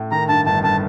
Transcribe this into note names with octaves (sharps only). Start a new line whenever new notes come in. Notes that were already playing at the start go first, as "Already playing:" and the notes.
Already playing: A2
D#3 A#5
G2 A5
G1 A5
G1 A5